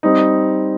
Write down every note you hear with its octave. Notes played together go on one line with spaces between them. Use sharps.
G3 C4 D#4